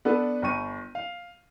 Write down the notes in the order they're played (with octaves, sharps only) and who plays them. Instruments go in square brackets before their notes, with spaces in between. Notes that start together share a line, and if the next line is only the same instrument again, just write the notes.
[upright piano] B3 D4 A4 B4
G1 G5 C#6 D#7
F5